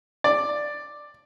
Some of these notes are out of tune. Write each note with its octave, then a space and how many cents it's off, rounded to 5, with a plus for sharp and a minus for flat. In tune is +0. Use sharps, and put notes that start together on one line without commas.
D5 +5